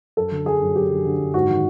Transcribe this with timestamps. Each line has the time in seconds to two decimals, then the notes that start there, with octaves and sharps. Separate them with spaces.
0.17 F#2 A4
0.32 D3
0.46 D3 G#4
0.62 F#2
0.75 F#2 G4
0.91 D3
1.05 D3
1.20 F#2
1.34 G#2 F#4
1.50 D#3